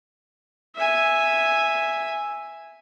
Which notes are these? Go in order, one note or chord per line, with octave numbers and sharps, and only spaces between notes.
E5 G#5